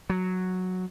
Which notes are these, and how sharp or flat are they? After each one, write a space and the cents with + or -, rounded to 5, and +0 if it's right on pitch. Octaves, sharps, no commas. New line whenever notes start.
F#3 -5